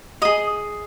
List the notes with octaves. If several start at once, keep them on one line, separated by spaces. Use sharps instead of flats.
G#4 D#5 D#6